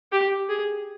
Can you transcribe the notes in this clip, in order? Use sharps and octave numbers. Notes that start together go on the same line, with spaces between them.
G4
G#4